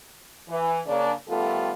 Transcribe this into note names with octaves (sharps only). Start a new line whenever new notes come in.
E3
C#3 A#3 D4
D#3 G3 A3 B3 F4 A4